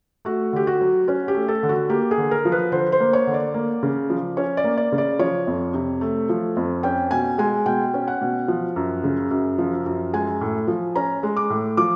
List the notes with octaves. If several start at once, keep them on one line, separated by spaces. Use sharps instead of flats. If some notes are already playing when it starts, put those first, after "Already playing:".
A3 F#4
D3 G4
F#4
F#3
C#4 F#4
G4
A3
A4
D3
F#4
A#3 G4
G#4
D3
A#4
F3
B4
D3 C5
C5
A#3
C#5
D3
D5
A#3
C#3
F3
C#4 C#5
D5
A#3
D5
C#3
D5
F3 C#5
F2
C3
A3
F3
F2
C#4 G5
B2 G#5
G#3 G#5
B2 G5
C#4
F#5
B2
F3
F#2
C#3
F#2
F3
F#2
G#3 G#5
A2
F3
C#4 A#5
G#3
D6
A2
F3 D6